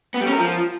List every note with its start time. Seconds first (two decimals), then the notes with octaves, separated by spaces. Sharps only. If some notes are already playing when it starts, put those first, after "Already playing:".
0.14 B3
0.20 G3
0.26 C#4
0.32 A#4
0.38 F3